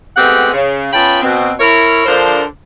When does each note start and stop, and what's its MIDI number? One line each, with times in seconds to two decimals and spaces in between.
0.17 0.52 56
0.17 0.52 57
0.17 0.52 59
0.17 0.52 60
0.17 0.52 67
0.17 0.52 78
0.53 0.89 49
0.93 1.20 59
0.93 1.20 61
0.93 1.20 65
0.93 1.20 79
0.93 1.20 81
0.93 1.20 83
1.22 1.53 47
1.22 1.53 60
1.60 2.03 64
1.60 2.03 70
1.60 2.03 73
2.06 2.42 50
2.06 2.42 53
2.06 2.42 62
2.06 2.42 70
2.06 2.42 72